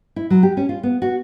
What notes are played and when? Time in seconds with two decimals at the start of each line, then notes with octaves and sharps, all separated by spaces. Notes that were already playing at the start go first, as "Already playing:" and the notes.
0.16 E4
0.30 F#3
0.43 G4
0.57 C#4
0.69 F4
0.83 B3
1.02 F#4